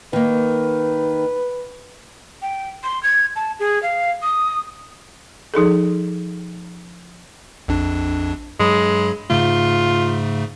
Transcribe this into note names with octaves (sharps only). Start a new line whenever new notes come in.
D#3 A#3 B4
G5
C6
G#6
A5
G#4
F5
D#6
F3 D#4 G#4 A4
A#1 F2 D4
G2 F#3 G#3 B5
G#2 C#3 A3 F4